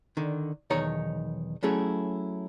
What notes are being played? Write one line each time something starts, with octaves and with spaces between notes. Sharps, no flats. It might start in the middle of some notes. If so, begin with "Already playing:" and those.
D3 D#3
B1 E2 D#3 D#4 C#5 A#5
F#3 A3 C#4 E4 G#4